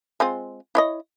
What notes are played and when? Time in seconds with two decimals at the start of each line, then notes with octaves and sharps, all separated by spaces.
0.20 G#3 C4 F4
0.75 E4 C#5 D#5